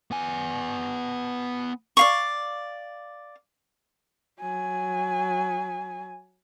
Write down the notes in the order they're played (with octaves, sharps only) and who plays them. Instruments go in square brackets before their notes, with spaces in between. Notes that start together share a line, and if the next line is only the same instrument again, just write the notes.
[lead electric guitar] B3 G#5
[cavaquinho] D5 F5 C#6
[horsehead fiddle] F#3 G#5